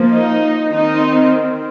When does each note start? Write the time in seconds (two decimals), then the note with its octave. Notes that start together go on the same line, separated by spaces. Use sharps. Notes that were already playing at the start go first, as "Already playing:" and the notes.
Already playing: F3 A#3
0.13 D#4
0.72 D#3 C4 D#4